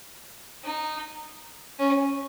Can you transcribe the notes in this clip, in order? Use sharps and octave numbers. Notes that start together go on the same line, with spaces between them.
D#4
C#4